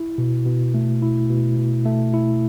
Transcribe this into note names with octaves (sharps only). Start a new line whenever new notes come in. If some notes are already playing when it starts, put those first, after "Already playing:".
Already playing: E4
B2
B2
A3
E4
B2
B2
A3
E4